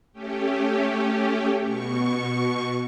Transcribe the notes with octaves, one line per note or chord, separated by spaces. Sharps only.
A3 C#4 G4
B2 C#6